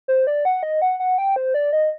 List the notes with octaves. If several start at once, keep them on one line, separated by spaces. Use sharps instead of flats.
C5
D5
F#5
D#5
F#5
F#5
G5
C5
D5
D#5